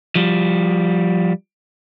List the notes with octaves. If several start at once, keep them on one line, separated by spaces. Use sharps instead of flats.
F3 G3